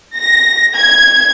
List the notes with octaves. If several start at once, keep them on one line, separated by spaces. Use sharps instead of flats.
A#6
G#6